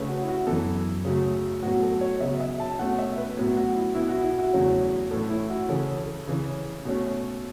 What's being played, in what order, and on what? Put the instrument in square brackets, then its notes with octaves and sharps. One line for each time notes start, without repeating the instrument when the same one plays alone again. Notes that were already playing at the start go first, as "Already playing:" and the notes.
Already playing: [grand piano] C#3 A3 C#4 B4
F#4
E4
F#4
F#2 E3 B3 A4
C#3 F#3 A3
A2 F#3 B3 F#4
A4
C#5
C#3 F#3 B3 E5
E5
A5
B2 A3 C#4 F#5
E5
B4
A2 F#3 B3
F#4
E4
B2 B3 E4
F#4
E4
F#4
E2 C#3 F#3 A3 C#4
A2 E3 A3 C#4 A4
E4
F#4
C#3 E3 C#4 A4
A4
C#3 E3 C#4
B2 A3 C#4